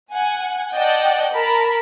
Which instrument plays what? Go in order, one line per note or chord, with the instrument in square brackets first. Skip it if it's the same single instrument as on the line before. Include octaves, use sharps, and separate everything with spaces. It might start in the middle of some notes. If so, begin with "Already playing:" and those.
[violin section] F#5 G#5
D5 D#5 F#5 G5 A5
A#4 A5 B5